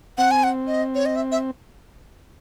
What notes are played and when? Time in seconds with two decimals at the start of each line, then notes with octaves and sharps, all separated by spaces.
0.18 C4 F#5
0.31 G#5
0.44 F#5
0.67 D#5
0.95 C#5
1.06 D#5
1.16 E5
1.32 E5